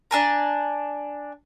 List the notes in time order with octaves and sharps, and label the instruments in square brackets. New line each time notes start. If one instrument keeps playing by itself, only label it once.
[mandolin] D4 G#5 A#5